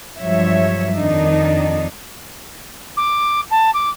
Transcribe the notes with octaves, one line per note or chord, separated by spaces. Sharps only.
G2 F3 F#3 C#5 E5
F2 D#3 D4 D#4
D6
A5
D6